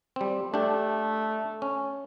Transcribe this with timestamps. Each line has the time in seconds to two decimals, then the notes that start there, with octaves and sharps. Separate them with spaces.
0.16 G3 C4
0.54 A3 D4 G4
1.62 C#4